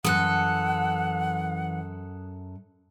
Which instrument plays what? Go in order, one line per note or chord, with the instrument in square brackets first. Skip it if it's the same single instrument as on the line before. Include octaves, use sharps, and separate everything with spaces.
[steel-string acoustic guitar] F#2 A4 [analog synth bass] E3 [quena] F#5 [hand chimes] D#6 F#6